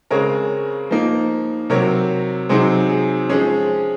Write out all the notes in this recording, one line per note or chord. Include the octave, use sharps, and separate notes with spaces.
C#3 G#3 C4 A#4 C#5
F3 A#3 D#4
C3 F#3 C4 A#4 C#5
C3 F#3 C4 D#4 G#4 C5
G#4
F3 G#3 C#4 G#4